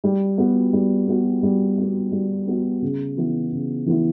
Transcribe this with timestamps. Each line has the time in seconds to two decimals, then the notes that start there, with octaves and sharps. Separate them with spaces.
0.04 G3
0.38 B3 F#4
0.73 G3
1.08 B3 F#4
1.43 G3
1.78 B3 F#4
2.12 G3
2.47 B3 F#4
2.82 C#3
3.17 E3 B3 E4
3.52 C#3
3.86 E3 B3 E4